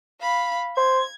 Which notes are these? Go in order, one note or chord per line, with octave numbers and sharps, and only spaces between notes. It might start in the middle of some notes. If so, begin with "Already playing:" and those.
F5 B5
C5 G#6